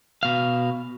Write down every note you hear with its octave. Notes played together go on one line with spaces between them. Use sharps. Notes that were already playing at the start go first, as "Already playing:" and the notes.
B2 F5